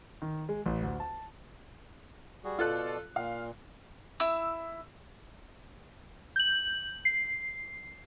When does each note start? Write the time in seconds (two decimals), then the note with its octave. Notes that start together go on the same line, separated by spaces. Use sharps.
0.22 D#3
0.49 G#3
0.66 A1
0.83 D2
1.00 A5
2.44 G3 F#4 G#4
2.59 B2 F4 A4 D5 F#6
3.16 A#2 F5
4.20 E4 E6
6.36 G6 F#7
7.05 C7